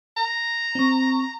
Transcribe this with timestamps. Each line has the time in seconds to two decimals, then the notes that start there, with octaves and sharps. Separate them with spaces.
0.17 A#5
0.75 C4 C#6